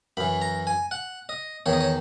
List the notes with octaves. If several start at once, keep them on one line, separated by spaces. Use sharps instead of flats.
F#2 E3 B5
A#5
G#5
F#5
D#5
E2 D#3 C#5
D#5
C#5